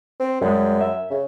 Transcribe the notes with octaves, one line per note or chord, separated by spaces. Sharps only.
C4
F#2 G3 G#3
E5
C#3